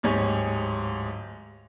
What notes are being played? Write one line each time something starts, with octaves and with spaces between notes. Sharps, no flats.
D1 G#2 G4 C#5 G#5